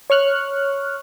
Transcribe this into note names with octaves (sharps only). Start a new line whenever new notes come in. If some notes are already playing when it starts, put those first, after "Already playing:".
C#5 C#6 F6 F#6